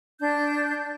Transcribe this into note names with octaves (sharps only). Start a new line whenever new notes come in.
D4 G6